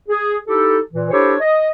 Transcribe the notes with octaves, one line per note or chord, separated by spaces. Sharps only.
G#4
D#4 E4 G4 A4
A#2 E3
D4 E4 G4 A4 C5 C#5
D#5